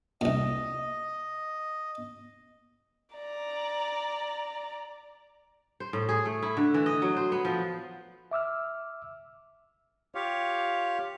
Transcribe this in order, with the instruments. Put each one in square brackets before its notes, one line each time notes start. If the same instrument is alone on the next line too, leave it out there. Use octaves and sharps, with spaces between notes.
[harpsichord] C2 A#2 [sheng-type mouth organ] D#5
[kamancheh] D5 A#5
[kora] C5
A2
G#4
A3
E4
D3
E3
D#5
F#3
C5
B3
F3
[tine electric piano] E5 D6 E6 F6
[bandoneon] F4 G4 C#5 F5